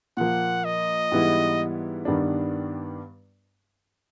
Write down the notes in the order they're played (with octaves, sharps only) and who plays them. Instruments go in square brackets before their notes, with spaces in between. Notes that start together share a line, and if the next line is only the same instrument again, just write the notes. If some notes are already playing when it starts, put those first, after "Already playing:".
[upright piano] A#2 F3 A#3 [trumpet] F#5
[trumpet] D#5
[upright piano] G#2 E3 G3 B3 E4
G2 D#3 G3 B3 D4